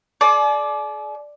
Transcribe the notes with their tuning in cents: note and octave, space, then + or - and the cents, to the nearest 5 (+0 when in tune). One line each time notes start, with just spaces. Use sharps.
G#4 +45 D5 +0